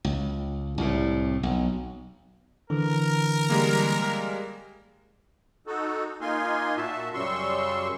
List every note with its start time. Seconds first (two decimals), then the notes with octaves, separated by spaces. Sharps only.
0.05 C#2
0.78 C2 A2
1.43 B1
2.70 D3 E3 A#4
3.50 G3 G#3 A#3
5.67 D#4 F#4 A4
6.21 A#3 D#4 F4 G#5 C6
6.77 A#2 F#4 E5 A5
7.14 F#2 C#3 G3 C6 C#6 E6